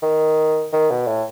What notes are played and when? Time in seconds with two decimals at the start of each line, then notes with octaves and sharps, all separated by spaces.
0.02 D#3
0.73 D#3
0.90 B2
1.07 A2